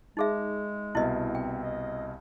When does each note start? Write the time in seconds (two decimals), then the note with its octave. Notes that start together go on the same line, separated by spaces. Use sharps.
0.17 G#3 D#4 G#4 E5
0.95 C2 B2 E4 D#5 E5
1.35 C4 G5
1.63 D#5